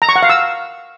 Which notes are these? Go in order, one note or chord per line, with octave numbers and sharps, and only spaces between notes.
A#5
C#6
F#5
F5
E6